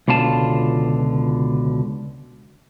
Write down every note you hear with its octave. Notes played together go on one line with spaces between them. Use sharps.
C#2 B2 D3 F4 A5